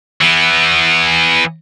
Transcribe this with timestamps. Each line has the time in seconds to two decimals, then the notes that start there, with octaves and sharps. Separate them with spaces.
0.21 E3 B3